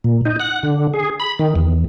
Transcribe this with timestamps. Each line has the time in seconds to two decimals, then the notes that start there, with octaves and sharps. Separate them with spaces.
0.04 A#2
0.25 D#4
0.40 F#5
0.63 D3
0.94 G#4
1.20 B5
1.39 D#3
1.56 E2